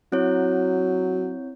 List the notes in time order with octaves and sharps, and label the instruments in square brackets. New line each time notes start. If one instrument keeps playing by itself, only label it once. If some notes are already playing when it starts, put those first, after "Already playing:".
[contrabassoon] F#3 [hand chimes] C4 E4 C#5